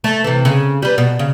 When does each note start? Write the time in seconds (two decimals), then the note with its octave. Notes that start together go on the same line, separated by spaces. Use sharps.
0.04 A3
0.24 C3 E3
0.45 C#3
0.82 G3 B4
0.98 B2
1.19 C#3